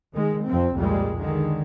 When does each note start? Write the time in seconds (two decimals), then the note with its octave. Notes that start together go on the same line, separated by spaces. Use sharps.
0.13 D#3 G#3
0.46 F2 C3 F3 C4
0.75 C2 F2 A#2 G3 G#3
1.17 D3 D#3 G#3